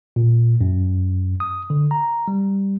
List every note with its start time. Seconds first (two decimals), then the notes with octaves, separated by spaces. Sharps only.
0.16 A#2
0.61 F#2
1.40 D#6
1.70 D3
1.91 A#5
2.28 G3